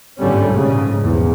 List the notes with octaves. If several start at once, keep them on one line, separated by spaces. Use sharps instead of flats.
G1 G#2 D3 G3 A3 C#4
A#1 G#2 C#3
A#1 E2